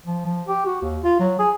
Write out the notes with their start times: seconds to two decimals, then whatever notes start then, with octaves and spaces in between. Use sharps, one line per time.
0.06 F3
0.25 F3
0.47 G4
0.66 F#4
0.82 D#2
1.04 F4
1.19 F#3
1.39 G#4